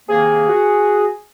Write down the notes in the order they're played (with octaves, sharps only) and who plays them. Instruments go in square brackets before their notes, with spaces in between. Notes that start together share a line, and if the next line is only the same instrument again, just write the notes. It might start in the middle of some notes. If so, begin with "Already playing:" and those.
[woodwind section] C3 D#3 A#3 [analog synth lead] G#4
[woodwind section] F#4